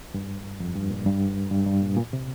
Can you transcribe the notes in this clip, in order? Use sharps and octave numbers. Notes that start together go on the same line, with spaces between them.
G2
F2
G2
A#2
G2
G2
G2
A#2
A#2
C3